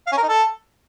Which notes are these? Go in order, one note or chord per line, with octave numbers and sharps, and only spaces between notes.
F5
C#4
A#4
D#4
A4